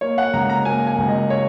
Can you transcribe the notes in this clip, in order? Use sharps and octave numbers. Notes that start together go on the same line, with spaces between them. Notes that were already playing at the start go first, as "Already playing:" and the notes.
A#3 C#5
F#5
C#2 A#5
A#5
A#3 G#5
G#5
C#2
D#5
C#5